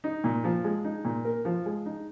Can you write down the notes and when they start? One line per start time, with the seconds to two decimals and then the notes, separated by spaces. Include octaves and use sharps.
0.04 D#4
0.24 A#2
0.44 F3
0.64 G#3
0.84 D#4
1.05 A#2
1.25 A#4
1.45 F3
1.66 G#3
1.86 D#4